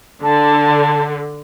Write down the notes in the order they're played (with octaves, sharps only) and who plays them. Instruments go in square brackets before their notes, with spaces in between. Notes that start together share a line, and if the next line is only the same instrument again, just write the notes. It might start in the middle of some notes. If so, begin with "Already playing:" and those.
[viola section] D3 [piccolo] A5